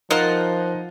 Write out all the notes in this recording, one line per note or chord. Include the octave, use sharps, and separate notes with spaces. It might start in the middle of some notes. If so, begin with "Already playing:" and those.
F3 D#4 F4 A#4 C5 D#5 F#5